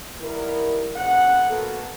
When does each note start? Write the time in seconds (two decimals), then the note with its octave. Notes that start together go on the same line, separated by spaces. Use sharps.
0.21 D#3 G3 B3 E4 A#4
0.96 A#2 C#3 B3 F#5
1.49 A#3 B3 F#4 A4